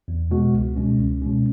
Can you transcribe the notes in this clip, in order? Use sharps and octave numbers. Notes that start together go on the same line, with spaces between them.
E2
B2 G#3 B3 F#4
C#2
B2 G#3 C#4
C#2
B2 G#3 C#4